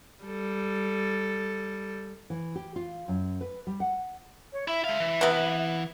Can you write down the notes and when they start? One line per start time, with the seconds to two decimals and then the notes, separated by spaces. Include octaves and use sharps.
0.25 G3 A4
2.30 E3
2.56 G4
2.76 F4
3.08 F#2
3.41 B4
3.67 G3
3.80 F#5
4.53 C#5
4.68 E4 E5
4.84 G#3 E5 F5
5.00 E3
5.21 C3 B3